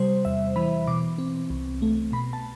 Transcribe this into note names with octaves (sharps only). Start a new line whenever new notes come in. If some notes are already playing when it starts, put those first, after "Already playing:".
Already playing: C3 G3 C5
E2 E5
E3 B5
B2 D6
C4
C2
A3
B2 B5
A5